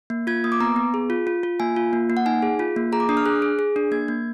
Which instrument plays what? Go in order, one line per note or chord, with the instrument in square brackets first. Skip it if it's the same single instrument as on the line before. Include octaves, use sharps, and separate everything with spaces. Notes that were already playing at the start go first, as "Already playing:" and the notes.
[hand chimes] A#3
F4 G#6
A#3 D#6
D6
B3 A#5
B3
G#4
F4
F4
F4
A#3 G#5
F4
A#3
A#3
F#5
D#4 G#5
G#4
F4
A#3
G#4 A#5
D6
D4 D#6
F6
G#4 F#6
G#4
G#4
D4
A#3 G#6
A#3